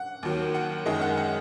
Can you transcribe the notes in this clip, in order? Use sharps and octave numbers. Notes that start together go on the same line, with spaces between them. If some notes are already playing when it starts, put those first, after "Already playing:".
Already playing: F#5
D#2 D#3 F#3
F#5
F#2 D#3 G#3 D#5
F#5
F#5